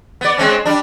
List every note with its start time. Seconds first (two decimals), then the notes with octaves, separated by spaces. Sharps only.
0.21 B3 D5
0.38 G#3 C4 C#4
0.65 G3 D4